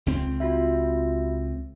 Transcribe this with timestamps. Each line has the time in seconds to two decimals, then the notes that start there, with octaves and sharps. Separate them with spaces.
0.06 C#2 C4
0.40 F4 F#4 E5